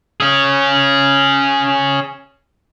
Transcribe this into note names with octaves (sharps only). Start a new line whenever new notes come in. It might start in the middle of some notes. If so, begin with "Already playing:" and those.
C#4 G#4